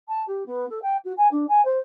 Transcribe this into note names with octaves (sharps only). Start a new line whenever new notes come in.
A5
G4
B3
A4
G5
F#4
G#5
D4
G#5
C5